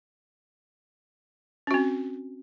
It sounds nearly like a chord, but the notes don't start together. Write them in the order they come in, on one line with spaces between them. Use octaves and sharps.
C#4 F#4 C4